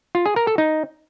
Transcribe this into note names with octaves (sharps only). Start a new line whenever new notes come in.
F4
G#4
A#4
A4
D#4